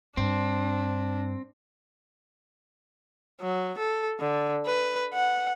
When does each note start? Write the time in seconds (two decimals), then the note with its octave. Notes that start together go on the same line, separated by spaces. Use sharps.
0.17 G2 C4 D4
3.41 F#3
3.78 A4
4.20 D3
4.66 B4
5.13 F#5